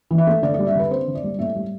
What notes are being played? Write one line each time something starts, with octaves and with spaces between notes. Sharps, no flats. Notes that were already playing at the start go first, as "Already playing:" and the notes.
E3
E5
A3
D3 D5
G3 D5
E5
D3 B4
C4 C5
D3
D5
G3
A2 E5
G3